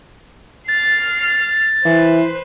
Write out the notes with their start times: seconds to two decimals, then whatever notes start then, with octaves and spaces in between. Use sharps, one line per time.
0.68 F6 A6 C7
1.85 E3 B4 C5